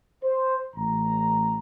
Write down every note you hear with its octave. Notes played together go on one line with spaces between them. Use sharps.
C5
A1 A#5